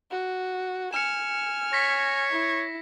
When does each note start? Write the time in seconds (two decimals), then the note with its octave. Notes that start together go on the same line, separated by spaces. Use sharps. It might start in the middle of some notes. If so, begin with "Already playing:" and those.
0.11 F#4
0.93 G#5 F6 C#7 E7
1.73 C#5 A#6 B6
2.31 E4